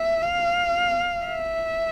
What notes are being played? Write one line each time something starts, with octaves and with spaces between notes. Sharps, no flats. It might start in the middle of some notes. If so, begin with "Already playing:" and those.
Already playing: E5
F5
E5